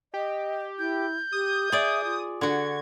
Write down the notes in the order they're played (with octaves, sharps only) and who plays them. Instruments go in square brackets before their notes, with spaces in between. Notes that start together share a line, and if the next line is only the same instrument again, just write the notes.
[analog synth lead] G4 [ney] D#5
[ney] E4 [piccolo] G6
[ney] G4 [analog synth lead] D#6
[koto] G#4 D5 [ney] E5
[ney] F4
[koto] D3 F#4 [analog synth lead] G#6